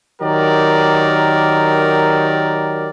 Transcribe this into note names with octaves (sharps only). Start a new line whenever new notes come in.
D#3 F#3 G4 A#4 D5